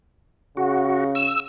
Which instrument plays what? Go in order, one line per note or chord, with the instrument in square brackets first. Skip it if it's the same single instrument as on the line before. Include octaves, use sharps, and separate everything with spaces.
[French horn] C#3 [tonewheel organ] F#4
[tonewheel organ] E6